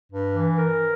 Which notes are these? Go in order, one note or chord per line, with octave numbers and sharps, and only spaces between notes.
G2
E3
A#4